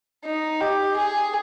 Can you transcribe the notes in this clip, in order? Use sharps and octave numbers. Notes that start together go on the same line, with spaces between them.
D#4
G4
G#4